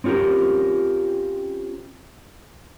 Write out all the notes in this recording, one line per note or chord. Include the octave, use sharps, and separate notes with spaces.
C4 C#4 F4 G4 A#4